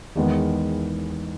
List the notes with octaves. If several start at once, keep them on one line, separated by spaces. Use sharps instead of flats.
E2 D#3 G#3 B3